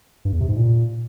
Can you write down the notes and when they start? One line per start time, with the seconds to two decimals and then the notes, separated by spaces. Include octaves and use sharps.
0.25 G2
0.33 E2
0.41 C3
0.48 G#2
0.56 A#2